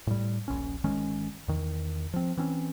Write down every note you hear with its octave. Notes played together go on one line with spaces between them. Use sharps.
A2 G3
D#1 A#1 C#4
G1 D#3 G#3 C#4
E2 D#3
F3 C4
E3 C4 C#4